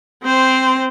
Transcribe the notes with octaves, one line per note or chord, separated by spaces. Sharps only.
C4 C5